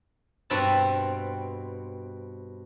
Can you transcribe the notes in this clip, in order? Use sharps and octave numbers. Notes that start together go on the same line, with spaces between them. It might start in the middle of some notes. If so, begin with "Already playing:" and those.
G2 B2 C4 B4 E5 A5